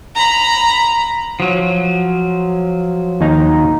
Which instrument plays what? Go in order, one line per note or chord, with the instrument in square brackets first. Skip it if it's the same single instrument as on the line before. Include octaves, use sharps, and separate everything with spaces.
[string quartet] A#5 B5
[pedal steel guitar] F3 F#3
[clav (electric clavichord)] D#2 D#4 A#5